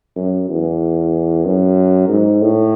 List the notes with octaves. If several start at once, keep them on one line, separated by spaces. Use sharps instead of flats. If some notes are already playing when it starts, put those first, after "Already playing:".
F#2
E2
F#2
G#2
A2